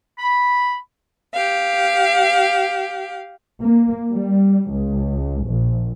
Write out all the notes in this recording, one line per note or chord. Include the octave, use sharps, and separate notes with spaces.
B5
G4 F5
A#3
G3
C#2
A#1